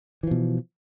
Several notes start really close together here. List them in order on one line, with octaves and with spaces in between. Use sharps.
E3 F3 B2